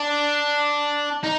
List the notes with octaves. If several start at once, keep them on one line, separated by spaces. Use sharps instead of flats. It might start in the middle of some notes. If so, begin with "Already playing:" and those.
Already playing: D4
D#4